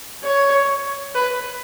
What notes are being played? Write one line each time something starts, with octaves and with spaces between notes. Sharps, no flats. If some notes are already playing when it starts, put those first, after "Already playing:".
C#5
B4